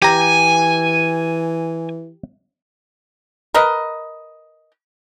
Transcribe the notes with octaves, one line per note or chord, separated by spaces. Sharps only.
E3 G4 G#5 A#5
A#4 B4 D#5